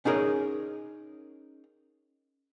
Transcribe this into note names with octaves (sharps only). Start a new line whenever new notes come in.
C#4 D#4 G#4 A#4 C#5 D#5